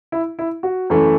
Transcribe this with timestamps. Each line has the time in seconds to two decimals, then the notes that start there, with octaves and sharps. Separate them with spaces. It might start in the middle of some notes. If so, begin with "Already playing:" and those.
0.12 E4
0.39 E4
0.63 F#4
0.90 F#2 E3 A3